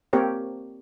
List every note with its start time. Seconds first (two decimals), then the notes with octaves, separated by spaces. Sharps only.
0.13 A#3 C4 G4 A#4 C#5